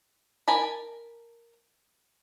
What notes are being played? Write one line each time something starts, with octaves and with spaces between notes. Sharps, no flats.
A#4 G#5 A5 B5